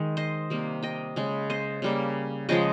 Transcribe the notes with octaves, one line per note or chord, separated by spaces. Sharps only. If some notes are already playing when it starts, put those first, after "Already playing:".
Already playing: D#3 G#3
C5 D#5
C3 G3 A#3
D#5 G5
C#3 G#3
C5 D#5
C#3 G3 A#3
C#3 F3 G#3 D#5 G5